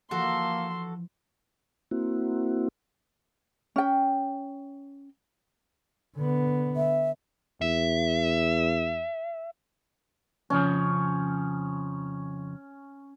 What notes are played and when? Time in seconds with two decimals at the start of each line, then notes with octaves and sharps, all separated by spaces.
0.11 E3 F3 A#3 F#4 A4 C6
1.91 A#3 C4 E4 F#4
3.76 C#4 G5
6.17 D3 B3
6.76 E5
7.62 E2 E5
10.50 F2 C#3 F3 C#4